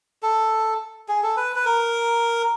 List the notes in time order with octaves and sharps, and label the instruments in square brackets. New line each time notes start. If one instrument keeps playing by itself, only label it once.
[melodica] A4
G#4
A4
B4
B4
A#4